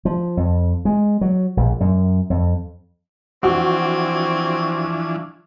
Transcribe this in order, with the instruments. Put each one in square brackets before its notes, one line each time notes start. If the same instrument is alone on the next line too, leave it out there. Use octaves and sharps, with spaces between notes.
[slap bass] F3
F2
G#3
F#3
A#1
F#2
F2
[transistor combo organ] E3 F3 D4 [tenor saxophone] C4 [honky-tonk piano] F#4 [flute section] C#6 G#6